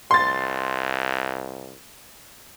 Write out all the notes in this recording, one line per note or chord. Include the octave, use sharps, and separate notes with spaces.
C2 C6 A6